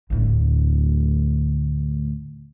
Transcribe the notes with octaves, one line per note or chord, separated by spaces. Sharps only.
D2 A2